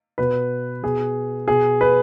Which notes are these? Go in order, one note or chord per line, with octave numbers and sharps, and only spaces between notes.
B2 B4
B2 G#4
B2 G#4
B4